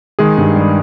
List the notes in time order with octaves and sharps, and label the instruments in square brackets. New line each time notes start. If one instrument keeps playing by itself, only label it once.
[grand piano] D#3 [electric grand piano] G#3 G#4
[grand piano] G2
G3